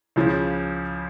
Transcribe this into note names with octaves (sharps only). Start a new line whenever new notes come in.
C#2 C#3 F3